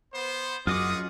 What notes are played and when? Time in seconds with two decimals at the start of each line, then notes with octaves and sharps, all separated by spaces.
0.14 B3 C5
0.67 F#2 F4 G#4 D#5 F#5 D6 D#6